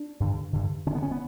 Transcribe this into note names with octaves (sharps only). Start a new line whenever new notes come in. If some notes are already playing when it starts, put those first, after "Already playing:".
Already playing: D4
G2 D3
G2 D3
G2 D3 C#4
B3
C#4
B3